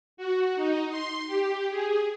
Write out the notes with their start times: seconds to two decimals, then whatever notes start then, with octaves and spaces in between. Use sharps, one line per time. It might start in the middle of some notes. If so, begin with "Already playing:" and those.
0.17 F#4
0.56 D#4
0.90 C6
1.27 G4
1.70 G#4